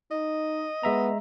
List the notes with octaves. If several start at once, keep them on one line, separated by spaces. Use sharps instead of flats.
D#4 D#5
G#3 B3 E5 A#5